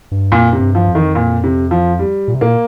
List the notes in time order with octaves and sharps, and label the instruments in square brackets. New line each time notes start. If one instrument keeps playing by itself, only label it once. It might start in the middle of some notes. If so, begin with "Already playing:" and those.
[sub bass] G2
[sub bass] F2 [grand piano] A#2
[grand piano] C3
[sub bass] G2
[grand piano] F3
[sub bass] F2
[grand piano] D#3
A#2
C3
F3
G3
[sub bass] A#2
C3
[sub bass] A#2 [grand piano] A#3